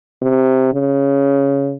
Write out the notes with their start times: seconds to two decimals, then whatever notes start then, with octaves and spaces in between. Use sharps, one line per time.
0.22 C3
0.73 C#3